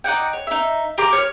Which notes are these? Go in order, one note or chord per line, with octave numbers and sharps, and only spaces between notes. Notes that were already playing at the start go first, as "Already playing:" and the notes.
D#4 D5 F#5 G5
C#5
D#4 E5
G4 A#4 C6 D6
C#5 F6